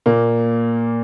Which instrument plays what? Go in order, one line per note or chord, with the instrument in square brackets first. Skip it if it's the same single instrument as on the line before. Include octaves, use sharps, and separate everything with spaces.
[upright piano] A#2 A#3